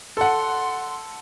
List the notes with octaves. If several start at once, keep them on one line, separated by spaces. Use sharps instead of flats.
A4 F#5 C6